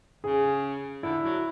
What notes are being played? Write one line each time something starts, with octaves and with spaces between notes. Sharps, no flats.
C#3 G#4
D3 E4
F#3